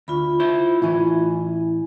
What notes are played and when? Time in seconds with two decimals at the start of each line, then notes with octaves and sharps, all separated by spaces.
0.08 D2 F4 B5
0.40 E4 C5
0.82 A2 E3 E4 G#5